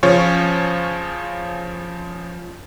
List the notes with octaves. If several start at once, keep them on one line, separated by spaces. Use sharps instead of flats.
C#3 F3 C#4 F4 C#5 C#6